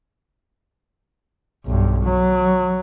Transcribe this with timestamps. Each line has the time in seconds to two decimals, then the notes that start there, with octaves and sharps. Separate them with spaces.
1.66 B1 G2
2.04 F#3